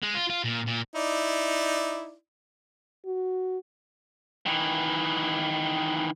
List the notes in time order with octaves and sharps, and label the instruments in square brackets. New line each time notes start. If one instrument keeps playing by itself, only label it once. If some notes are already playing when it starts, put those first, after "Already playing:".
[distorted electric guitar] G#3
F4
F4
A#2
A#2
[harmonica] D#4 E4 D5
[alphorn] F#4
[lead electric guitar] D#3 E3